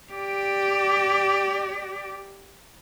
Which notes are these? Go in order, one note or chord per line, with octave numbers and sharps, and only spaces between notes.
G4 D5